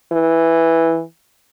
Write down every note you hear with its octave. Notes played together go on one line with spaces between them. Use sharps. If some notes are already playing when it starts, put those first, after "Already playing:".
E3